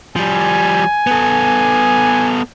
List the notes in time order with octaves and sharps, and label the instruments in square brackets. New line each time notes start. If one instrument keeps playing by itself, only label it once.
[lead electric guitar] F3 G3 [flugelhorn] G#5
[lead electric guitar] B3 A4